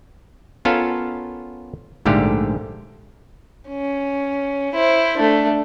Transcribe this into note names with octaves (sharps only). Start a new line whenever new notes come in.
B3 C#4 F4 A4 A#4 F5
A#1 G#2 D3 A3 G4 F5
C#4
E4 C5
A3 D4